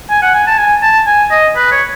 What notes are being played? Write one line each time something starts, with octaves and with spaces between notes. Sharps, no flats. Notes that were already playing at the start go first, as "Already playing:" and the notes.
G#5
F#5
G#5
A5
G#5
A5
G#5
D#5
B4
C#5